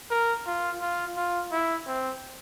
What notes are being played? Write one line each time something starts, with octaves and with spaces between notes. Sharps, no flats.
A#4
F4
F4
F4
E4
C4